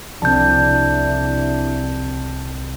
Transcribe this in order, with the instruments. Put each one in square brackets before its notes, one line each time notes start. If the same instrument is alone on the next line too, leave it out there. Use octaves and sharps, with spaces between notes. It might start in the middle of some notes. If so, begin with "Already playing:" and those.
[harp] C2 [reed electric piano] F3 C4 [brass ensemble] D4 E4 D5 [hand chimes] A5 G6